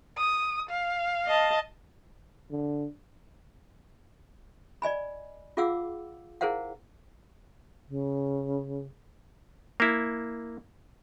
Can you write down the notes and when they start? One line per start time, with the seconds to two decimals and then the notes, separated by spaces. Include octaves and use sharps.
0.18 D#6
0.69 F5
1.26 D#5 A5
2.51 D3
4.82 D5 D#5 G#5 B5
5.57 F4 G#4 F5 F#5 D6 E6
6.41 E4 G#4 A#4 C5 F5 F#5
7.88 C#3
9.80 A#3 E4